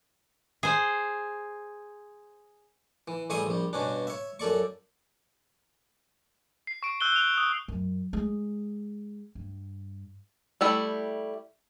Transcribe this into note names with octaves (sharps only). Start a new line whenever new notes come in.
G#4 C5
E3
A1 G3 G#4 E5 C#6 D#6
A#1 G3
G2 B2 C#4 D4
C#5 E5
F#2 A4 D5 C#6
C7
C#6 D7
E6 F#6 G6 G7
F#6 F7
D#6
F#2
G#3
G2
G3 A3 E4